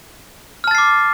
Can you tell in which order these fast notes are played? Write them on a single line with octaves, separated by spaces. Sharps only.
F6 A5 A6 C7 D6